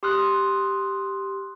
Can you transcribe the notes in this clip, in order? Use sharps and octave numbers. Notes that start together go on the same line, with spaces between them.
G4 C6 D#6 F6 F#6